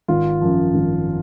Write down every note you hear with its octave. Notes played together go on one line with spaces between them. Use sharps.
G#1 F4
F#2 F3
G#1